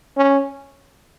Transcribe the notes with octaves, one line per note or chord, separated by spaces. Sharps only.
C#4